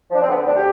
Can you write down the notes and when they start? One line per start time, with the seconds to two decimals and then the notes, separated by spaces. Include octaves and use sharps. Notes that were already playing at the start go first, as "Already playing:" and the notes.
0.10 F3 D4
0.22 C4
0.29 D3 B3
0.38 C4
0.46 D2 D4
0.56 G4